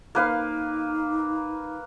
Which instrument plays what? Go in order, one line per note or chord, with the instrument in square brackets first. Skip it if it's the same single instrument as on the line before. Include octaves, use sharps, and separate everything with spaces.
[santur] A#3 B4 F5 [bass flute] D#4